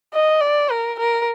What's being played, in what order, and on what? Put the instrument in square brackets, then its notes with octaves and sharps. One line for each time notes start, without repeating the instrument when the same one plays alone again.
[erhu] D#5
D5
A#4
A#4